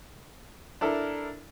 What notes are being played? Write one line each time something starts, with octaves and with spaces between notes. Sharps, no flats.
D4 E4 A4 A#4